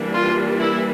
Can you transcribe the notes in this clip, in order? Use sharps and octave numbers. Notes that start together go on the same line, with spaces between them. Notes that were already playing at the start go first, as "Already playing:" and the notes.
Already playing: E3 G3 A#3 D4
F4
E4